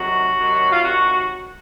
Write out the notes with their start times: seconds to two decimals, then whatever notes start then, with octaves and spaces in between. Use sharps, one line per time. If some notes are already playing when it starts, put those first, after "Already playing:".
Already playing: C3 D#3 F#3 F#4
0.37 C3 D#3 F#3
0.72 F4
0.83 C3 D#3 F#3 F#4